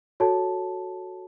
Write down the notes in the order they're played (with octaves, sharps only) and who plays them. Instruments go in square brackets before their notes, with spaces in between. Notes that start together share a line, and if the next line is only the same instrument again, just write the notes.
[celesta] F#4 A4 C#5 A5